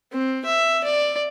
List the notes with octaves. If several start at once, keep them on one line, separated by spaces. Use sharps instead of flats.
C4
E5
D5